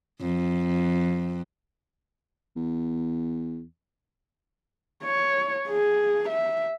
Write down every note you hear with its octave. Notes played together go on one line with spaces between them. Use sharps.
F2
E2
C#5
G#4
E5